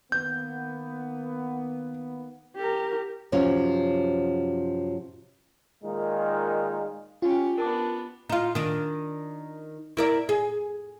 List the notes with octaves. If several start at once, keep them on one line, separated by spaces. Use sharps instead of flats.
D#3 A#3 B3 G6
G4 A#4
F#2 C3 F3 C#4
A#2 D#3 G#3 D#4 F4
C#4 F4 G4
B3 D4 A#4 A5 D6
D#4 F4
D#3 D4
E4 A#4 D5
G#4